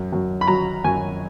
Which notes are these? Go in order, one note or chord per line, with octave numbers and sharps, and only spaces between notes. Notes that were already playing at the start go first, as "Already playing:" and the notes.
Already playing: F#2
F#2
B5
F#3 A#5
F#2 G#5